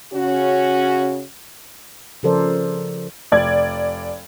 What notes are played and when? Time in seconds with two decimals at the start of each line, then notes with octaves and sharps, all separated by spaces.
0.14 C#3 C#4 F#4
2.23 C#3 F3 A4 A#4 C5 D5
3.32 F1 D5 G#6